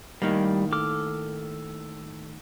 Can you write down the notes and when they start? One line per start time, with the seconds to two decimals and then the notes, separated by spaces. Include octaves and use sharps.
0.22 A2 D#3 G3 A#3
0.73 A4 D6 F6